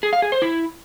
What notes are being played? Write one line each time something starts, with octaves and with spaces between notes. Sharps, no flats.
G#4
F5
G#4
C5
E4